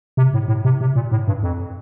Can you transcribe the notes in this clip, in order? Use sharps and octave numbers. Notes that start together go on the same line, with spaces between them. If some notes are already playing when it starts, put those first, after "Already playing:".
C3
A2
A2
C3
C3
A#2
A2
G2
F2